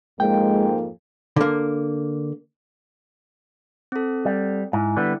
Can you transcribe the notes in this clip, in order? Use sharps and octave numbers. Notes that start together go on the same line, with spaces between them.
F2 G#2 G#3 A#3 G5
D3 A#3
C4 A4
G3
G#2 E4
D3 G3 B3